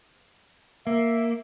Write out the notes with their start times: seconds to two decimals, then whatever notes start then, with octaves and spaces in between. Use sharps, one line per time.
0.87 A#3 E5